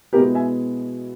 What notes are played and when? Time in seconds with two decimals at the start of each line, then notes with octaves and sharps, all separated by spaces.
0.13 B2 G#3 B3 E4 G4 A#4
0.35 E5 G#5